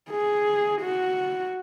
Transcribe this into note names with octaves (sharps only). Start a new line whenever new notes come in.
G#4
F#4